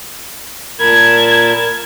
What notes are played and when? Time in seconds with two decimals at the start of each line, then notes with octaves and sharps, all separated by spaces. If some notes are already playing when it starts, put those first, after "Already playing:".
0.80 A#2 A#4 A5 B5 G#6